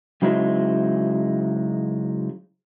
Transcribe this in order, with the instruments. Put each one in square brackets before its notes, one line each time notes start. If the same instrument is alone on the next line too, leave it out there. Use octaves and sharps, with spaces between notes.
[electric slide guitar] C#3 F#3 G#3 D#4 E4 C5